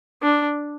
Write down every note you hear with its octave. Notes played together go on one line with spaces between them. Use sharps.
D4